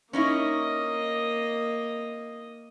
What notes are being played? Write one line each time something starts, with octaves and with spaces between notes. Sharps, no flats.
A#3 C#4 D#4 E4 D#5